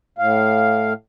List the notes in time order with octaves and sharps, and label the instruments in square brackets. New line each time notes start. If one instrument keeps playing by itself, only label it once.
[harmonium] A2 F5